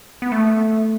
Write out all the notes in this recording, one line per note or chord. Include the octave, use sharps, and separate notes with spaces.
B3
A3